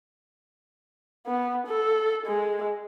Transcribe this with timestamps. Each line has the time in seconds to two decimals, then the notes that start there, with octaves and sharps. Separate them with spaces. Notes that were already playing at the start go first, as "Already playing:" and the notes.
1.27 B3
1.67 A4
2.26 G#3